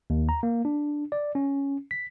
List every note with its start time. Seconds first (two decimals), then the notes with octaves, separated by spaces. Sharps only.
0.10 D#2
0.29 A#5
0.43 A#3
0.65 D4
1.12 D5
1.35 C#4
1.91 B6